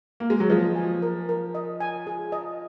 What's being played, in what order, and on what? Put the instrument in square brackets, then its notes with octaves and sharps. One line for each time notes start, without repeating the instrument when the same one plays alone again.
[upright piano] A#3
G#3
F#3
[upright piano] F3 [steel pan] D#5
[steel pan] G#5
A#4
A#4
D#5
G#5
G#4
D#5